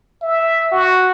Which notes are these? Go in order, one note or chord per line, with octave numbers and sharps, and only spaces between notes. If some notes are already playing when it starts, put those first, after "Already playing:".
E5
F#4